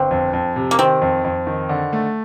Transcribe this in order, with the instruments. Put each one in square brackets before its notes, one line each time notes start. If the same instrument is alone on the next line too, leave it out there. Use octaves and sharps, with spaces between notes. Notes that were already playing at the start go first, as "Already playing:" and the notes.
Already playing: [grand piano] G1 [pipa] C4
[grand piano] F2
F2
C3
[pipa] A#3
[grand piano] D#3 [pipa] C4
[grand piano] F2
F2
D#3
D3
A3